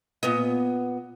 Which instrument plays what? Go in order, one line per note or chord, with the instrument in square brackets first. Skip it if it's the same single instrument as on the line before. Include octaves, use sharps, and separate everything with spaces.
[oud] A#2 B3 D#5